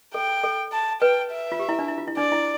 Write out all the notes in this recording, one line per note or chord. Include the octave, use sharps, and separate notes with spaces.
A4 G5
A4
A5
B4 G5
E5
F4
G4
E4
D4
E4
F4
E4
D4 D5
E4